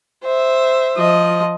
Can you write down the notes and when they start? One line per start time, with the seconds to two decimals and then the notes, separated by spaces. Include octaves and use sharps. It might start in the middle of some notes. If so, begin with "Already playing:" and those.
0.24 C5 E5
0.98 F3 D#5